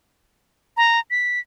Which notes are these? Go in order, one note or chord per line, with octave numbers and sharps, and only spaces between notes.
A#5
B6